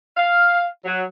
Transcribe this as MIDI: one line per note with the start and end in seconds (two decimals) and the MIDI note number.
0.17 0.66 77
0.85 1.03 54